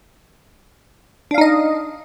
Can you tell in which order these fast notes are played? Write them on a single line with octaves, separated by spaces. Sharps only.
D4 F5 D#4 D#5